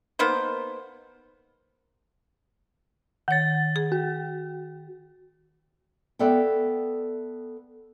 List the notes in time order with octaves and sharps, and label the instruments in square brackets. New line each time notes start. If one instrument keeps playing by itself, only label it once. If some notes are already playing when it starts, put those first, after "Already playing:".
[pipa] A#3 B3 D#4 C5
[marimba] D#3 C#5 [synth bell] F#5 A6
[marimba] G#4
[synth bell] F#4
[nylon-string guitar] B3 A4 D5 E5 G5